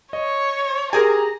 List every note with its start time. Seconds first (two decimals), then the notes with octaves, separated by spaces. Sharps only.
0.13 C#5 D#5
0.93 G4 G#4 A#4 C5 G#5 A#5